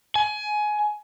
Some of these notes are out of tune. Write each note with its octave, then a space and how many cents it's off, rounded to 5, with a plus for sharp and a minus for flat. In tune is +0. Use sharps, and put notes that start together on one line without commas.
G#5 +20